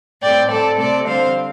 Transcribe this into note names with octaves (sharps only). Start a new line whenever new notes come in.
A2 A3 C4 D5 G5
A2 G3 C4 A4 D5
C3 A3 C4 A4 D5
D3 G3 C4 C5 F5